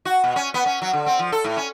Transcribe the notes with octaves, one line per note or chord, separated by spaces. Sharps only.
F#4
B2
C#4
B3
C#4
F#3
D3
C4
F3
A4
A2
C#4